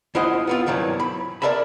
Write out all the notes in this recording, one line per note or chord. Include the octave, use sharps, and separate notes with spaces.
D#2 E4 F4 C5 D#5 F#5
B3 C4 F4
G2 B2 D#3 E3 F#3
B5
A#4 D5 E5 A5 B5